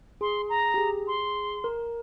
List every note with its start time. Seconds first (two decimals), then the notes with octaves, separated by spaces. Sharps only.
0.21 G#4 C6
0.49 A#5
0.74 G4
0.78 G#4
1.07 C6
1.64 A#4